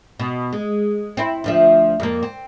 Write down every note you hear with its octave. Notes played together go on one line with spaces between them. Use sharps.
B2
G#3
C4 E4
D2 F3 E5
F2 A#3
C4